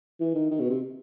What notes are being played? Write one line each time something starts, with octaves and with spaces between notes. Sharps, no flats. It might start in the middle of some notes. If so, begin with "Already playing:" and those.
E3
D#3
D#3
B2
C3